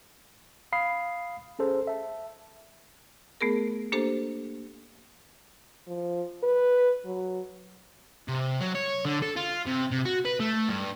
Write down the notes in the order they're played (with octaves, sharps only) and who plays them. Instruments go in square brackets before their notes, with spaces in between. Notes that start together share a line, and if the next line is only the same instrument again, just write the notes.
[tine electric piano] F5 B5 D#6 C7
C#4 G#4 A4 C5
E5 A5
[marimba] A3 B3 G#4 A#4
A#3 D4 G4 A4 C5
[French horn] F3
B4
F#3
[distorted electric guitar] C3
F#3
C#5
D3
A4
F4
C3
C3
F#4
B4
A3
G2